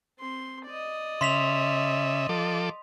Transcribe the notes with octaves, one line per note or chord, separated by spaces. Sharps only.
C4 C6
D5 D#5
C#3 E5 C6 B6 F7
F3 A4 D6